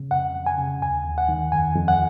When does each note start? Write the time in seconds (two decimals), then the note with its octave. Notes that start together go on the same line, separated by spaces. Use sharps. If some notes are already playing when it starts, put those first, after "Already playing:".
Already playing: C#3
0.11 F2 F#5
0.34 F2
0.46 G#5
0.58 C#3
0.82 D#2 G#5
1.06 D#2
1.18 F#5
1.29 D#3
1.52 F2 G#5
1.76 F2
1.88 F#5